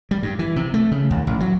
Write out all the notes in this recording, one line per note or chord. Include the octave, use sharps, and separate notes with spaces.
G3
G2
E3
C3
A3
C#3
D#2
A1
F#3